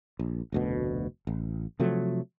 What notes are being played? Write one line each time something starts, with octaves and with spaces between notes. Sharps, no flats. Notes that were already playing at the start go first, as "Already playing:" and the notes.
A#1
F1 D2 B2
A1
C3 F3 F#3 A3